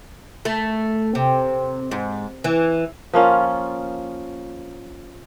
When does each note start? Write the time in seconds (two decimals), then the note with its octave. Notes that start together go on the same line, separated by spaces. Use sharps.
0.45 A3
1.15 C3
1.91 G#2
2.44 E3
3.14 F3 A#3 C#4 F4